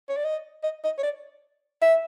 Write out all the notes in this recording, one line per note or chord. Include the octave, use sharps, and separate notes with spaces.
C#5
D5
D#5
D#5
D#5
C#5
D5
E5